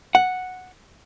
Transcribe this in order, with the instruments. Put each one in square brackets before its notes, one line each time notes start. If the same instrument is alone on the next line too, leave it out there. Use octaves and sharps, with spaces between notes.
[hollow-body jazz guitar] F#5